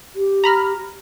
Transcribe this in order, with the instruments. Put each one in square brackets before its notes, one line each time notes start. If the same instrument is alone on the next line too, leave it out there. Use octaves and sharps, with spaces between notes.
[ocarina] G4
[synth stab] A#5 B5 F6